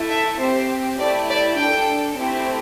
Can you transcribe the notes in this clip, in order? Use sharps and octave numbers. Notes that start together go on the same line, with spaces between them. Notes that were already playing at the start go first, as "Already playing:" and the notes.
Already playing: A3 E4 A4
E5
C4 G4 C5
A3 E4 G4 D5
D5
D4 A4 G5
A3 C4 E4 G4